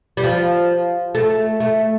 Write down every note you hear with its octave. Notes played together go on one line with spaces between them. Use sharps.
G3
F3
A3
A3